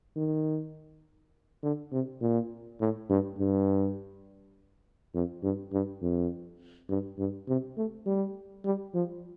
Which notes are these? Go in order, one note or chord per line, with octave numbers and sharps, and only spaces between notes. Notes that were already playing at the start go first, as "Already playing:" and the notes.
D#3
D3
C3
A#2
A2
G2
G2
F2
G2
G2
F2
G2
G2
C3
A3
G3
G3
F3